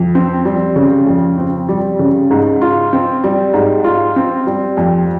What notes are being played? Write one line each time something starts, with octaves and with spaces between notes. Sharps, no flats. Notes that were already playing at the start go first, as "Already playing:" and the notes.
Already playing: F2
C4
G3
C#3
F2
C4
G3
C#3
G#2
F4
C4
G3
G#2
F4
C4
G3
F2